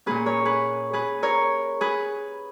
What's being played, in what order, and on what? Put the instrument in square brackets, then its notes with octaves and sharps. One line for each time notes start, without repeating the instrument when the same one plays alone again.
[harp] A#2 A#3 C#4 G#4 B4
A#4 C#5
G#4 B4
G#4 B4
A#4 C#5
G#4 B4